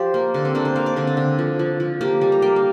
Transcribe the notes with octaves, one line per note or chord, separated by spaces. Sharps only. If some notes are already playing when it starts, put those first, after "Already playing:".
Already playing: F3 G4 C5 D5 F5
A#3
D3
C4
A#3 D4
C5
A#3 F5
D5
D3 C4
D4
D3
F3
F3
F3
A#3 G4
G3
A#5
A#3 G5
F5